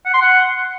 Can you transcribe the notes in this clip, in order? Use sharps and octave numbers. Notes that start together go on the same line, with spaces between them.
F#5
C6
F#5